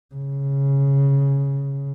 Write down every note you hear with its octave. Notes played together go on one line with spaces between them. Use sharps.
C#3